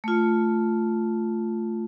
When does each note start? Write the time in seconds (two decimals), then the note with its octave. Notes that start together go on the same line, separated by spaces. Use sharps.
0.04 A3 F4